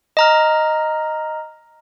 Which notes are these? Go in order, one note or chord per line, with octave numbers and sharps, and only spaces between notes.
D#5 A#5 F6